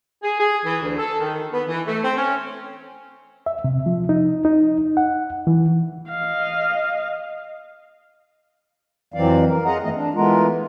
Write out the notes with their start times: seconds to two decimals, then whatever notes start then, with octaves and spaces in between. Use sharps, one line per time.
0.23 G#4
0.40 G#4
0.65 E3
0.82 D2
0.98 A4
1.20 D#3
1.53 B3
1.68 E3
1.87 A3
2.03 C4
2.17 C#4
3.46 E5
3.64 C3
3.86 F3
4.09 D#4
4.45 D#4
4.97 F#5
5.47 E3
6.09 D#5 F5
9.14 F2 E3 F#3 C4 D5 F5
9.47 A#4
9.65 F4 G#4 D#5 F#5 A#5
9.82 F#2 E3 A3 B3 D#5
9.94 D4
10.14 E3 G#3 A3 B3 F4 A#4